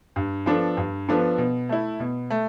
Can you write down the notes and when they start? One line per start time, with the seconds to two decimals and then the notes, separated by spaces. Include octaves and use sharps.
0.16 G2
0.46 F3 B3 D4 A4
0.77 G2
1.08 F3 B3 D4 A4
1.38 B2
1.69 A3 E4
2.00 B2
2.30 A3